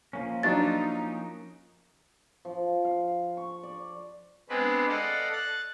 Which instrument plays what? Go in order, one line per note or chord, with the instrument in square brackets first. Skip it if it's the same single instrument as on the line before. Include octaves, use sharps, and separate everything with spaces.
[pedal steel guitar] F3 A#3 C#4
[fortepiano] F#3 D4 [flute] D#4 [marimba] A6
[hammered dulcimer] F3
F5
C#6
D5
[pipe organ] G#3 B3 C4 D4 B4
A4 D5 D#5 F5 F#5
F#6 A6